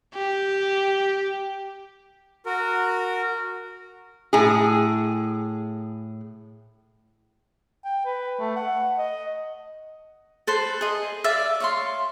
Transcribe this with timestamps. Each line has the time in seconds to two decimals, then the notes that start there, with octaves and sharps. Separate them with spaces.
0.14 G4
2.46 F#4 A#4
4.33 A2 G#4
7.85 G5
8.06 B4
8.40 A3
8.56 F#5
8.98 D#5
10.47 A4 B4 C5
10.81 G#4 D#5
11.24 D5 E5 F5
11.60 C#5 F5 C6